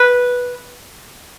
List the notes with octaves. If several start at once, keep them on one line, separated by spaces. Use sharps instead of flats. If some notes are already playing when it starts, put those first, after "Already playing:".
Already playing: B4